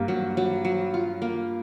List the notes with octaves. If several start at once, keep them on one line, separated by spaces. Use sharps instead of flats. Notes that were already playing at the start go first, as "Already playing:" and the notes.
Already playing: G2 G3 A#3
F#3
F#3
F#3
F4
A#3